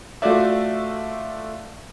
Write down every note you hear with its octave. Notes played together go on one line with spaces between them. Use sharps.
A3 F4 F#4 D5 E5